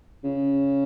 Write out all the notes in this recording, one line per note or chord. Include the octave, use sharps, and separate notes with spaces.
C#3